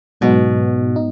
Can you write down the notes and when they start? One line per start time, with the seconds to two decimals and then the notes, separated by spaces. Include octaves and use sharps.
0.21 G#2 B2 F#3 B3 D#4
0.96 D#4